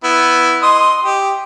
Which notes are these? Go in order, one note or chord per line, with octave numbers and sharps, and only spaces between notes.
B3 E4
D#5 C6 D#6
G4